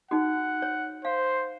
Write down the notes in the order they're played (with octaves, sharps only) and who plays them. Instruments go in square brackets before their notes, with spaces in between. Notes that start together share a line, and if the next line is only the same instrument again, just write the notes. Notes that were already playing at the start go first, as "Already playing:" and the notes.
[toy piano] D#4 F#4 [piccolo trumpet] F#5
[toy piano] C#5
[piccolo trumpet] C5 [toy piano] F5